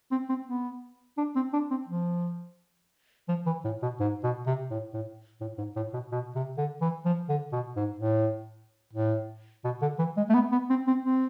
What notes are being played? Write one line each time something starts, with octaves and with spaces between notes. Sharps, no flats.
C4
C4
B3
D4
C4
D4
C4
F3
F3
E3
A2
B2
G#2
B2
C3
A2
A2
A2
G#2
A2
B2
B2
C3
D3
E3
F3
D3
B2
G#2
A2
A2
B2
D3
E3
G#3
A3
B3
B3
C4
C4
C4